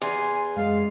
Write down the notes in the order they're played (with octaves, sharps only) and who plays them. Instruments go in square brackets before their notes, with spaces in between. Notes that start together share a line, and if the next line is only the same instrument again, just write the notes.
[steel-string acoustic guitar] E2 [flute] G#5 [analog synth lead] C6
[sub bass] F#2 [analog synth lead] G#3 [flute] F5